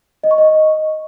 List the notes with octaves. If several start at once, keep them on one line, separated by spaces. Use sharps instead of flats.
D#5
C#6
D#5